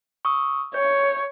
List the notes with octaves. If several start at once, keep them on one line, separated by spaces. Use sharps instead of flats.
C#6 D#6 E6
C#5 G6